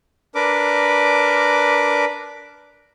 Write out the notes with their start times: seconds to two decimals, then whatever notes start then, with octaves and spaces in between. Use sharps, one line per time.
0.35 D4 A#4 B4 D6